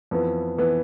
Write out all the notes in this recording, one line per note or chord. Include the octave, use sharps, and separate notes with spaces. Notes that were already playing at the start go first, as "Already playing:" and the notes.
F2 E3 B3
E3 B3